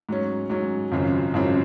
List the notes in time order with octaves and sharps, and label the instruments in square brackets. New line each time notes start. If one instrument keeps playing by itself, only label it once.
[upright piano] G#2 F#3 C#4
G#2 F#3 C#4
G#1 F#2 C#3 F3 C4
G#1 F#2 C#3 F3 C4